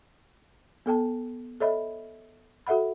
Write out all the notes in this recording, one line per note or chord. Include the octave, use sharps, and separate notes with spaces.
B3 A4 G5 A5
A4 C#5 D#5 E5 B5
F#4 A4 E5 F#5 B5